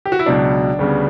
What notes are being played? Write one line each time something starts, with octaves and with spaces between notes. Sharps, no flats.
G4
F#4
E4
C#2 B2 F#3 D4
D2 C#3 G3 B3